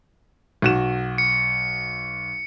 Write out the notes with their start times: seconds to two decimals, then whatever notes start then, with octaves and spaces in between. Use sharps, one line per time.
0.62 B1 F#4 E7
1.18 C#7